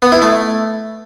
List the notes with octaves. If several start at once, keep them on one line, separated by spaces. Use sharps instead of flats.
B3
E4
A3